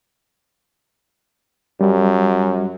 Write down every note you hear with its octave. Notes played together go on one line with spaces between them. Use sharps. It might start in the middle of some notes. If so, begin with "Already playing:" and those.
F#2 G3